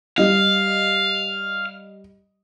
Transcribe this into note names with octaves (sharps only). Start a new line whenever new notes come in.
G3 D#5 F5